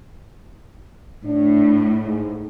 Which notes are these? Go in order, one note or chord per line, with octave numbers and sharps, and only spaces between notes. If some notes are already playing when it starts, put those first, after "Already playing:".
A2 D4
G#2